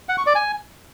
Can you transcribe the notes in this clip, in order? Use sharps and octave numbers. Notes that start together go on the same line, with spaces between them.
F#5
C#6
D5
G#5